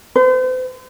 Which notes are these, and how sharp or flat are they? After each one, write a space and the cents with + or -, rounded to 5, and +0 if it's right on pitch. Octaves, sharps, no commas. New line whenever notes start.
C5 -40